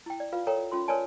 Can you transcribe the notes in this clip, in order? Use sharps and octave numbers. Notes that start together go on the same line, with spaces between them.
E4 G5
D5
F4 B4 F5
A4 A#4 C#5 G5 A#5
C#4 F4 C6
A#4 B4 C#5 D5 G#5 A5